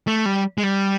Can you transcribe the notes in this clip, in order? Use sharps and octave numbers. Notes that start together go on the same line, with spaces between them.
A3
G3
G#3
G3